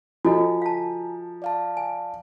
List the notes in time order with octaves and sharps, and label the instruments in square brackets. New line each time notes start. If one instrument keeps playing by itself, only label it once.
[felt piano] F3 [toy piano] F#4 A4 D#5 [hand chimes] G#5 A#5
[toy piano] F5 A5
[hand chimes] D5 F5 A5
[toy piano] G#5